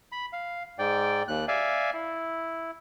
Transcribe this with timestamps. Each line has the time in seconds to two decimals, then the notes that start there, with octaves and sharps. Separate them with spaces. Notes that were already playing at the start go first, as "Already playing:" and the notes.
0.12 B5
0.33 F5
0.79 G#2 D5 G5
1.28 D#2 F#6
1.48 D5 E5 F5 G#5
1.94 E4